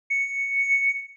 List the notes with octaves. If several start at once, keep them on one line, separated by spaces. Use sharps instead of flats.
C#7